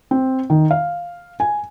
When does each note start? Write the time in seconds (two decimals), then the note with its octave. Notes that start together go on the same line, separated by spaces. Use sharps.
0.11 C4
0.50 D#3
0.71 F5
1.40 G#5